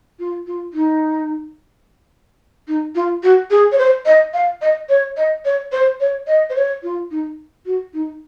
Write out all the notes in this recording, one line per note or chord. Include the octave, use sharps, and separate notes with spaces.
F4
F4
D#4
D#4
F4
F#4
G#4
C#5
C5
D#5
F5
D#5
C#5
D#5
C#5
C5
C#5
D#5
C5
C#5
F4
D#4
F#4
D#4